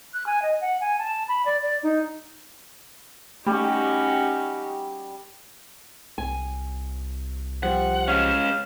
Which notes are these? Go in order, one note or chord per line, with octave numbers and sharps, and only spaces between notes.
F#6
G#5
D#5
F#5
G#5
A5
B5
D5
D5
D#4
G3 A3 C#4 D#4 F#4 G4
C2 G#5
F3 G3 F#5
G#3 C#4 F5